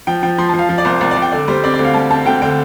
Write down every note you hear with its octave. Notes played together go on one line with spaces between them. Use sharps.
F3 G5
F3 G5
F3 C6
A5
F3
F5
F3
D5
C2 C5
C2 D5
D5
C2
G5
D3 D5
G3 C5
C4 D5
D5
D2
F5
G3 A5
C4 A5
D2 G5
D3 G5